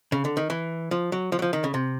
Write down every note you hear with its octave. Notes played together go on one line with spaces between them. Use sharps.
C#3
D3
D#3
E3
F3
F#3
F3
F#3
F3
D#3
C#3
C3